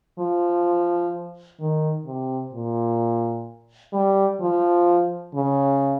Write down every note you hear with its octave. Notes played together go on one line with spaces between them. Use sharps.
F3
D#3
C3
A#2
G3
F3
C#3